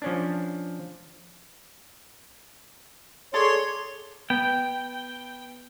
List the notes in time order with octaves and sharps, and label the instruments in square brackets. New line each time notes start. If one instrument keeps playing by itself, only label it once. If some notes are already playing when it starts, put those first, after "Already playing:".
[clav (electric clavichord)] F3 C#4 D4
[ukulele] G#4 A4 D5 [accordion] C#5 C6
[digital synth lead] B3 [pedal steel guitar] G5